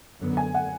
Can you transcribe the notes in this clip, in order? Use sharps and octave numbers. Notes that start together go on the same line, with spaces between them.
F#2 D3 F#3 B3
G#5
F#5